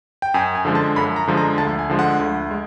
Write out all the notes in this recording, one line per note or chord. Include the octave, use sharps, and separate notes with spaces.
G5
F#2 G#5
G#5
D3 F3 G#3
A5
F#2 B5
A#5
D3 F3 G#3
A#5
D2 A5
G#5
D3 F3 G#3
F#5
D2
G#3